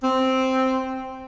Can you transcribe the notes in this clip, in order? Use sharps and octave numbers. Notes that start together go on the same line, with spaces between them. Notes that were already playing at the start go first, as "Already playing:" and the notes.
C4